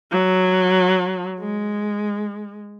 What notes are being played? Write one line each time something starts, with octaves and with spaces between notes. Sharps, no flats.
F#3
G#3